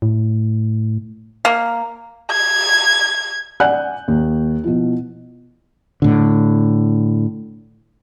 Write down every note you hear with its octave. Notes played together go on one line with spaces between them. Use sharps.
A2
A#3
G#6
D5 F#5 G#5 F#6 G6
D#2
B2 F3 E4
A2 D3